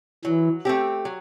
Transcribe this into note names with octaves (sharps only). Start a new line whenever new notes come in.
E3 F#3
A3 C4 G4
F#3